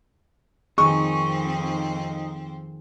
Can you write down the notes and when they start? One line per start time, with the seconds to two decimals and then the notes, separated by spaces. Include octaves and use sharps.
0.78 F2 D#3 C4 D#4 G#4 C#6